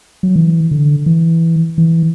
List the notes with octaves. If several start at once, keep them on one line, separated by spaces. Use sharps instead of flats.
F#3
E3
D3
E3
E3